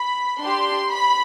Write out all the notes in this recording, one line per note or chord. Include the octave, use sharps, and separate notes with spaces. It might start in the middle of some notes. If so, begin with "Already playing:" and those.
Already playing: B5
D4 G4 C6
B5